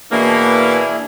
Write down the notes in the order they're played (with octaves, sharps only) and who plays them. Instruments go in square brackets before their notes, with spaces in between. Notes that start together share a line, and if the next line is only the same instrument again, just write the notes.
[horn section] B2 E3 A#3 [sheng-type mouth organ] D4 E4 G#4